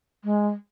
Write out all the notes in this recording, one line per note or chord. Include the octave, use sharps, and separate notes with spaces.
G#3